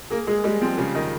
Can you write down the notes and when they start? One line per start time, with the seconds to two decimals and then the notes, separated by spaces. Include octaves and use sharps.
0.10 A#3 G#4
0.27 G#3 G#4
0.44 G3 G#3
0.61 F3 C4
0.77 C#3 G4
0.95 D#3 D#5